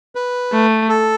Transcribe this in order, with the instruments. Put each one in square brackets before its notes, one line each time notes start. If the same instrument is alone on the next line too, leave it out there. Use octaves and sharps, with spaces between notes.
[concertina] B4
[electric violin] A3
[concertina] A4